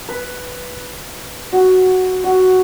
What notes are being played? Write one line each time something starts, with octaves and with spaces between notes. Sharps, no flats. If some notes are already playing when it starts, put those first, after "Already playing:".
B4
F#4
F#4